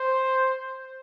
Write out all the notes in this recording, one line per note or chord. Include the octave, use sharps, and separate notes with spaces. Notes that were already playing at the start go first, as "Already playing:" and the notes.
Already playing: C5